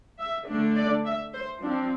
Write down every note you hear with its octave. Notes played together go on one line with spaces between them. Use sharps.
E5
D3 A3 D4
D5
E5
C5
F3 C4 D4